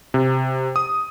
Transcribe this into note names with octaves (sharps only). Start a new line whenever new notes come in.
C3
D#6